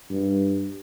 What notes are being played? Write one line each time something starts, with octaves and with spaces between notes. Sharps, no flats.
G2